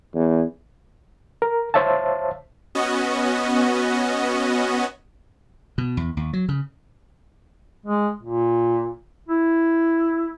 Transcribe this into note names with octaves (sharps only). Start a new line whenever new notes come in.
E2
A#4
C5 C#5 E5 F5 A5
B3 C#4 F#4 D#5
B2
E2
D#2
F#3
C#3
G#3
A#2
E4